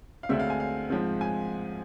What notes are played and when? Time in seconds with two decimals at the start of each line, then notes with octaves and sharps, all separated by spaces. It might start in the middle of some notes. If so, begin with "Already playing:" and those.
0.23 F5
0.29 D2 D3 G#3 C4 E5
0.39 F5
0.50 G#5
0.60 F5
0.90 G#2 F3 G#3 C4
1.21 G#5